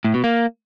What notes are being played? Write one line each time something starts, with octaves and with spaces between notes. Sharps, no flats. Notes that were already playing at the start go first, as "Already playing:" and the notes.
A2
B2
A#3